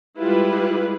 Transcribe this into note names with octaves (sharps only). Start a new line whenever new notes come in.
G3 G#3 E4 F4 B4